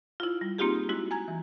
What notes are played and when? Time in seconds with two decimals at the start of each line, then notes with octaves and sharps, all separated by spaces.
0.20 E4 F4
0.41 G3
0.58 A#3 C4 D#4 F4 G4 G#4
0.89 G#3 E4 F#4
1.11 G#5 A#5 G#6
1.28 E3